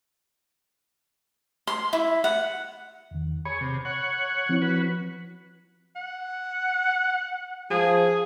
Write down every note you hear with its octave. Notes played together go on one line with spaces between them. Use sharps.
C6
E4
F#5
E2 D#3
G#4 C#5 B5
C3
C#5 F#5
F3 C4 E4
F#4 B4
F#5
F3 G#4